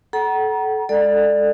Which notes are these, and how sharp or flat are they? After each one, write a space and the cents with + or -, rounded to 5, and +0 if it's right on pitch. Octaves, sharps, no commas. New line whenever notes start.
A4 -25 F#5 +35 A#5 +30
G#3 -10 A4 +10 D5 +20